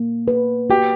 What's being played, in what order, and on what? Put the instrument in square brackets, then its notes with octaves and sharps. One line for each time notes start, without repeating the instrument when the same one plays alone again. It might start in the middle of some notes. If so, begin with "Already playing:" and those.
Already playing: [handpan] A#3
B4
[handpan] F#4 [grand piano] G4